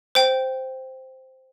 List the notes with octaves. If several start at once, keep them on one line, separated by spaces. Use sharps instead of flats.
C5 G5